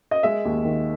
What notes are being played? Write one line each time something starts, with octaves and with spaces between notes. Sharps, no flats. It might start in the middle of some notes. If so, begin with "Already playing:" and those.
D#5
G#3 E5
D#2
D#3